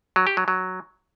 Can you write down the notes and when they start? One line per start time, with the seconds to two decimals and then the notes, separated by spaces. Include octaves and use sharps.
0.16 F#3
0.27 G4
0.37 F#3
0.48 F#3